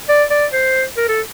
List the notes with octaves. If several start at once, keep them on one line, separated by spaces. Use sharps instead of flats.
D5
D5
C5
A#4
A4